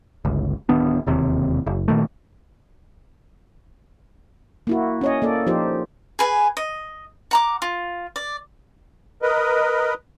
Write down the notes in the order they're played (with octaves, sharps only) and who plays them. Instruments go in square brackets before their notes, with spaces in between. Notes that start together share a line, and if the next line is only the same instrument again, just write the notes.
[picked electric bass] G1 C#2
D1 D#3 B3 D4
E1 D#2 C3
F#1
A#2 D#3 A3
[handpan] A#3 E4 F#4
C#4 C#5 D#5
A#3 A4 D5
F3 D#4 F4 G4 C5
[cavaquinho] G#4 B4 G#5
D#5
F#5 A#5 D6
F4
D5
[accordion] A#4 B4 D#5